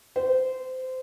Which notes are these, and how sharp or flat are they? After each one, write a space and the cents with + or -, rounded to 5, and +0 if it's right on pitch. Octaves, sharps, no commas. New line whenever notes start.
C5 -20